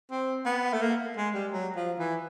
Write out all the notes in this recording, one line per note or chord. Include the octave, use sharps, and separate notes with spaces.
C4
B3
A3
A#3
G#3
G3
F#3
F3
E3